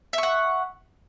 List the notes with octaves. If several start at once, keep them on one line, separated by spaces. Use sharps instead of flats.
E5 F#5 C#6